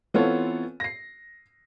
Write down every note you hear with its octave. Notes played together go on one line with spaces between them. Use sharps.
E3 B3 C4 F4 A4 C#5
A#6 C7